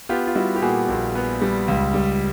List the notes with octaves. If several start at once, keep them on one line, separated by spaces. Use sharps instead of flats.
B3 F4 G4
F4
G3 E4 F#4
G4
A#2 F#4 G#4
A#1
B3
G3
C#2
G3